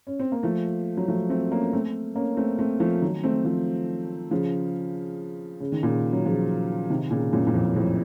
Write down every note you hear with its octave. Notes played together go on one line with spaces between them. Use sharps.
C#4
C4
A#3
F3 A3
F#3
F3 A3
A3 C4
A#3 C#4
A3 C4
A#3 C#4
A3 C4
A3 C4
F3 A3
D#3 F#3
A3 C4
F3 A3
C#3 F3
C#3
D#3
A#2 C#3
F#3
C#3 F3
C3 D#3
A#2 C#3
F#2 A#2
A#2
F2 A2
F2 A2